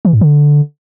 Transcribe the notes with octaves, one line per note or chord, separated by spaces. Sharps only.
E3
G#2
D3